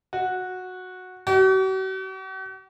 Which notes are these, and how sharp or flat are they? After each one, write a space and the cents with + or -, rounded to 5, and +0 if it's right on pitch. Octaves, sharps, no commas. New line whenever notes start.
F#4 -10
F#4 +45